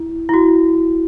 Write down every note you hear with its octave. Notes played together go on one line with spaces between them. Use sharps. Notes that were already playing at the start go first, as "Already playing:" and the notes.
Already playing: E4
E4
F#4